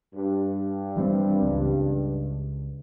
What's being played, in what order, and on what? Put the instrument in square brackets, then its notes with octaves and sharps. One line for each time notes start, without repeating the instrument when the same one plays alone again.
[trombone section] G2
[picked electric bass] E3 G3 C4
C#2